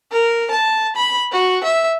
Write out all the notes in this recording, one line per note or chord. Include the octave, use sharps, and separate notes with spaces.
A#4
A5
B5
F#4
E5